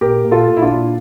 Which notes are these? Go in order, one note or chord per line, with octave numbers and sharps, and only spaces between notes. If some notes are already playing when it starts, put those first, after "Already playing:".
A#2 G4 A#4
A#2
F4 A4
A#2
E4
D4 F4
A#2